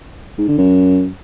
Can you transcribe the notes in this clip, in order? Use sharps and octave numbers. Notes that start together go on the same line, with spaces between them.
G#2
D3
F#2